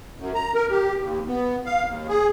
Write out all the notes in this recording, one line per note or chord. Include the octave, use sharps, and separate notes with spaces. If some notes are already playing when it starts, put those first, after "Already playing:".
F#2
A#5
A#4
G4
D#2
B3
F5
D#2
G#4